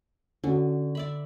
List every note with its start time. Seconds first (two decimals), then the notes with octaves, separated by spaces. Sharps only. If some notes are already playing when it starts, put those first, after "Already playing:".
0.44 D3 C#4 F#4
0.95 D5 E5 B5